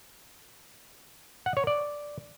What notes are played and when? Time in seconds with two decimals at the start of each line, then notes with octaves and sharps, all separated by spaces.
1.46 F#5
1.57 C#5
1.67 D5